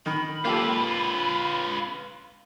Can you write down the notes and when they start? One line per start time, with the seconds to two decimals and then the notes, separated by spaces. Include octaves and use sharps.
0.06 D#3 B5
0.45 A#3 F4 G4 A4 B4